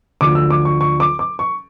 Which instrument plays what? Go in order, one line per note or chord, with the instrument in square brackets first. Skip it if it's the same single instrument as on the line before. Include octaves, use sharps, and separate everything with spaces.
[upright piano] D2 D3 F3 D6
E6
D6
C#6
C#6
D6
D6
C#6